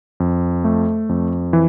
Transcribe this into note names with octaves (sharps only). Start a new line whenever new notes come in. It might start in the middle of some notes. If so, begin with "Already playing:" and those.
F2
A3
F2
E3